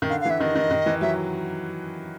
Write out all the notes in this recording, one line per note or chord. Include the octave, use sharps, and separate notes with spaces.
D#3
D3 F5
F5
E3 E5
D#3 D#5
D#3
D#3
E3
F#3 E5